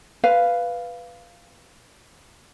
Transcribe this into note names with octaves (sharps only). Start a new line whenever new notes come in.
B4 F5